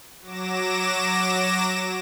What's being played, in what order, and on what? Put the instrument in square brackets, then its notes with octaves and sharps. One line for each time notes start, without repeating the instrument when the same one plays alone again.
[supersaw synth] F#3 D6 A#6 E7